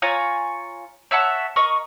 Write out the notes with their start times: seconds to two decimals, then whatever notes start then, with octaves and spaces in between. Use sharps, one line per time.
0.02 F4 C#5 G#5 A#5
1.11 C#5 E5 F#5 A5
1.56 A#4 D#5 C#6